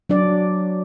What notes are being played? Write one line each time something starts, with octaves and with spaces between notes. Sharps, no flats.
F#3 D4 D5